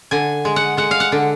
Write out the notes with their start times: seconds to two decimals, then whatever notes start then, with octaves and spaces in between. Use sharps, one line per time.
0.11 D3 G#5
0.45 G#3
0.56 F#5
0.77 G#3 F#5
0.91 F5
1.00 F#5
1.12 D3